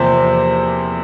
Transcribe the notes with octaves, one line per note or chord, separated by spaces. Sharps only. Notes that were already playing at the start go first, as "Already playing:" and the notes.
Already playing: E2 C3 F3 A#3 C5